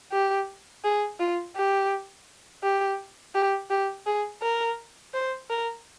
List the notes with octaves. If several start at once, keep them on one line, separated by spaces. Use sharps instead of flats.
G4
G#4
F4
G4
G4
G4
G4
G#4
A#4
C5
A#4